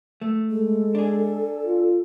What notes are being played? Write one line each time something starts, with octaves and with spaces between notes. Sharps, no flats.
A3
G#3 A4
D4 G#4
F4